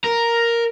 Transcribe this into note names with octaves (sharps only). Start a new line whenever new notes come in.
A#4